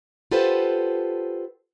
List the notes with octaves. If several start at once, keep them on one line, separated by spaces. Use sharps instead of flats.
F4 G4 A4 B4 C5 F#5